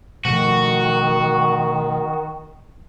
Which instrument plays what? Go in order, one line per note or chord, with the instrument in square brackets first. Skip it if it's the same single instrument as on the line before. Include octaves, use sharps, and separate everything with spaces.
[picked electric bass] B2 F3 A3 [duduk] D#3 [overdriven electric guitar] F#4